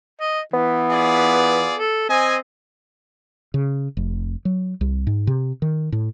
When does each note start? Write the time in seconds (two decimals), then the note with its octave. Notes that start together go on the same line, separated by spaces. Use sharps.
0.21 D#5
0.54 E3 B3
0.90 F4 G#4 D5
1.78 A4
2.09 C4 D#5 G#5
3.54 C#3
3.97 F1
4.45 F#3
4.81 C2
5.07 G#2
5.27 C3
5.62 D#3
5.92 A2